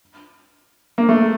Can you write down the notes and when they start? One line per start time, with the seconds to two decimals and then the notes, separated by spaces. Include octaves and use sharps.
0.98 A#3
1.09 A3